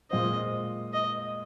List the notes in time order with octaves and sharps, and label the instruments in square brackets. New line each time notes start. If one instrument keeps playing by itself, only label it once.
[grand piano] A#2 G#3 F4 C5 [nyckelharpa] D#5
[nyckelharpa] D#5